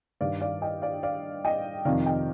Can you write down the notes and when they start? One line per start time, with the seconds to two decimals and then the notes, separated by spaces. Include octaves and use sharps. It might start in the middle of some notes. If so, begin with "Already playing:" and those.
0.21 G2 D#3 D5 F5
0.41 D5 F5
0.62 D#5 G5
0.82 D5 F5
1.03 D5 F5
1.45 D#5 G5
1.85 F2 C3 D#3 D5 F5
2.06 D#5 G5